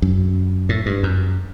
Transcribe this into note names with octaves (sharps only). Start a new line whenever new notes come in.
F#2
A2
G2
F#2